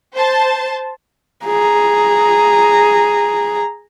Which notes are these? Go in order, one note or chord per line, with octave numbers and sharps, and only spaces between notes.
C5 A5
G#4 A#5